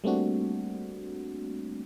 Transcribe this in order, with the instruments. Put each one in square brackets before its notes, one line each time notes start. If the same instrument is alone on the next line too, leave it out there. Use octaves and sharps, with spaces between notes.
[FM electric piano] G3 A3 A#3 C4 D4 F#4